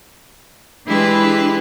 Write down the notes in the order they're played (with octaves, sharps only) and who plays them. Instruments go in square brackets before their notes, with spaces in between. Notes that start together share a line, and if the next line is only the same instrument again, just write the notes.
[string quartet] E3 G#3 D4 E4 G4 B4